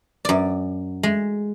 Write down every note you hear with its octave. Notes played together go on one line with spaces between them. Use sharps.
F#2 D5
G#3